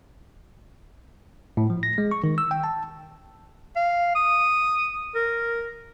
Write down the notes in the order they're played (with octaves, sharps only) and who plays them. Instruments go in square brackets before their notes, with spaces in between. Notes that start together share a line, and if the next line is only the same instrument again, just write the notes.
[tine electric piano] A2
F3
A#6
G#3
C#6
D#3
E6
G5
A5
[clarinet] F5
D#6
A#4